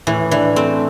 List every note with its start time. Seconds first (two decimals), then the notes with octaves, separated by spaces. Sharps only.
0.07 A2 E3
0.31 E3 D4
0.56 A3 C4